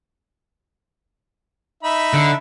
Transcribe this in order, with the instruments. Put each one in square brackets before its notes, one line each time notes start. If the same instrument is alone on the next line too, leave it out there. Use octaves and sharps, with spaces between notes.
[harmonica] D#4 E5 B5
[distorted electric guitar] D3